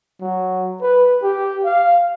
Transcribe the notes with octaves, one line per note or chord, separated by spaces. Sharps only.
F#3
B4
G4
F5